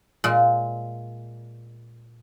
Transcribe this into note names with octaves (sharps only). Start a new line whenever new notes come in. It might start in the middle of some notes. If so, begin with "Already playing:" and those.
A#2 G#3